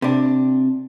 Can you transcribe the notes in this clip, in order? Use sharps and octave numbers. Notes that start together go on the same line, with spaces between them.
C3 D4